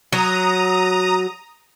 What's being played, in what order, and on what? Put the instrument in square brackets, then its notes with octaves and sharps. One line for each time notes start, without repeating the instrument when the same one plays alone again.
[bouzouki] F#3 [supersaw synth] A#5 D#6